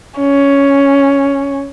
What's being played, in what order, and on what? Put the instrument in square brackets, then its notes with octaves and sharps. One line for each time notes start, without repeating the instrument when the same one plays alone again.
[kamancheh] C#4